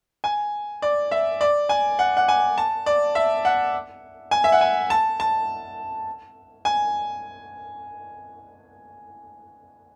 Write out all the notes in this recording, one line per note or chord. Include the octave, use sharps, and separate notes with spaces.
G#5
D5
E5
D5
G#5
F#5
F#5
G#5
A5
D5
E5
F#5
G#5
E5
F#5
G#5
A5
A5
G#5